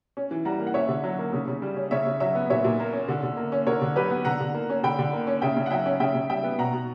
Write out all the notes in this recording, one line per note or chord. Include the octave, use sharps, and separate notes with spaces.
C#4
E3
G3 F#5 A#5
A#3
F#5
C#4 C#5 E5
D3
F#3
A#3
C#3
C#3
G3
C#4
C#3 C#5 E5
C#3
F#3 C#5 E5
B3
A#2 C#5 E5
A#2
A#3
C#4
D3
D3
A#3
C#4
D3 A#4 C#5
D3
F#3 G4 B4
B3
D3 F#5 A#5
D3
A#3
C#4
D3 G5 B5
D3
A#3
C#4
C#3 E5 G5
C#3
F#5
F#3 E5 G5
C#4
C#3 E5 G5
C#3
G3 E5 G5
B3
B2 F#5 A#5
B2